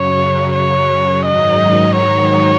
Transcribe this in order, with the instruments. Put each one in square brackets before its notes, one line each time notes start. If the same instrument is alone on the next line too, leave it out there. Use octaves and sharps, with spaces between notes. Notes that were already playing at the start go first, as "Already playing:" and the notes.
Already playing: [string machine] F#2 C#3 F#3 [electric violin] C#5
[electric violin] C#5
[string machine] G#2 D#3 F#3 D#4 [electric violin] D#5
[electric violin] C#5